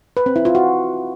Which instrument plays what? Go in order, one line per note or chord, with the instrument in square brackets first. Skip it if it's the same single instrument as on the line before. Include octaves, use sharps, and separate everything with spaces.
[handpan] B4
C4
E4
F4
F#4